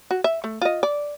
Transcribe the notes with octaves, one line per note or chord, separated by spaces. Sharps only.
F#4
E5
A3
F4 D#5
D5